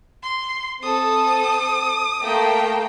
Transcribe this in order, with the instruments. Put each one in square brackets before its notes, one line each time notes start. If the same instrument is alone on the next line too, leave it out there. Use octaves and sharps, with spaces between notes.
[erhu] C6
[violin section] C4 A4 [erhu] D#6
[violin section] A3 A#3 G5